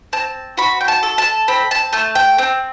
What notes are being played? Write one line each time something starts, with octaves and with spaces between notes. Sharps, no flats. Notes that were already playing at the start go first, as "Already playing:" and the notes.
C4 A5
F#4 B5
G5
A5
A4
A5
C4 B5
A5
A3 A5
G5
C4